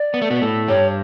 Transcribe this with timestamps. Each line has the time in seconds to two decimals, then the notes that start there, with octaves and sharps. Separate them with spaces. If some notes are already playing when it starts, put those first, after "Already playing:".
Already playing: D5
0.14 B3
0.22 A3
0.30 B2 B3
0.42 A2 A3
0.68 G2 G3 C#5